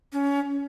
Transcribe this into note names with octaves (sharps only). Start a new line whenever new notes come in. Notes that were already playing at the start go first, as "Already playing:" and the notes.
C#4